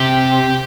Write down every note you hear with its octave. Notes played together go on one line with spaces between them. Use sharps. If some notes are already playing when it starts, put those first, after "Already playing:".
Already playing: C3 G4